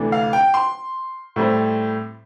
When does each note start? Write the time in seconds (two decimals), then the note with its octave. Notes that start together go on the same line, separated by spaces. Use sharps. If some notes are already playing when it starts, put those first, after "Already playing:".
Already playing: D2 C3 E3 A3 D4
0.12 F5
0.33 G5
0.54 C6
1.36 A2 G3 C4